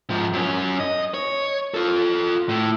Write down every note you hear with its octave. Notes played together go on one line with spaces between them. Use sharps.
G#2 F3
F#2 C#4
D#5
C#5
F4 A4
A2